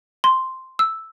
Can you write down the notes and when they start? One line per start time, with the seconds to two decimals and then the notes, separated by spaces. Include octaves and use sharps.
0.24 C6
0.79 E6